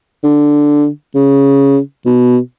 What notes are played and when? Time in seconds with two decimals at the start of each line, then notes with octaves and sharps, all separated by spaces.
0.23 D3
1.15 C#3
2.06 B2